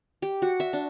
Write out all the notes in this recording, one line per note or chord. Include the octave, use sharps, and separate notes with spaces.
G4
F#4
E5
D4